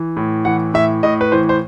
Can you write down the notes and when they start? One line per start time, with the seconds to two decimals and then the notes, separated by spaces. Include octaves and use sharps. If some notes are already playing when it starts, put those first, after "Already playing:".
Already playing: E3
0.17 A2
0.45 E3 F#5
0.74 A2 E5
1.03 A2 D#5
1.21 B4
1.32 E3 C5
1.49 C5